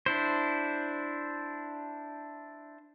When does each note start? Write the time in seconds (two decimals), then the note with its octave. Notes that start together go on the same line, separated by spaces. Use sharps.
0.06 D4 E4 C5